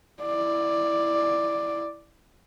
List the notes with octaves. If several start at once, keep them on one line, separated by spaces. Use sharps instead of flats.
E4 D5